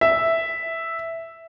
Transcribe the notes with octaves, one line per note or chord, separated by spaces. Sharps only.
E5